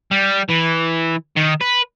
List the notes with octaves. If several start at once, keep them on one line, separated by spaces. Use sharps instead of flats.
G3
E3
D#3
B4